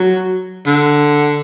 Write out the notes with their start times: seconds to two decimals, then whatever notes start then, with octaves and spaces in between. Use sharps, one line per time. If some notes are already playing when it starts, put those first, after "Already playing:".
Already playing: F#3
0.66 D3